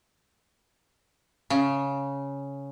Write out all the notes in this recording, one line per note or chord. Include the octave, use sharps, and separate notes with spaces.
C#3